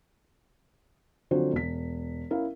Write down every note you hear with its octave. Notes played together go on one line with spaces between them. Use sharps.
D3 F3 F#3 C4 F#4 C5
E1 B6
C#4 E4 A#4 F5